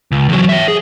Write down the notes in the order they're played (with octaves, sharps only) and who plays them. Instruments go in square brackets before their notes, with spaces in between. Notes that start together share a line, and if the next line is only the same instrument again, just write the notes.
[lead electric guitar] C#2
E2 F#3
C#5 E5
G#4